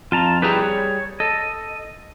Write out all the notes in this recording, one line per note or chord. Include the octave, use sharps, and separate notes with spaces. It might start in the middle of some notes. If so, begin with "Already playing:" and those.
F2 F4 A5 A#5
G3 E4 G4 G#4 B4 A#5
C#5
A4 D#5